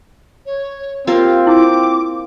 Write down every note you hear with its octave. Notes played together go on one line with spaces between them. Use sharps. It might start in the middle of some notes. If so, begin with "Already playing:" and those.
C#5
A#3 C4 F4 G4
E4 D6